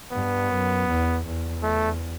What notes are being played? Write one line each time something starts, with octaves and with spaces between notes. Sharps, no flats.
G2 B3
F#2
E2
E2
A3